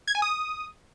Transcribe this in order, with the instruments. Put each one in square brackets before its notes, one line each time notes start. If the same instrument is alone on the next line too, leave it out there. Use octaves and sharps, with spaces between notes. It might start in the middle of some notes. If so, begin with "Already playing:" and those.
[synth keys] G#6
G#5
D#6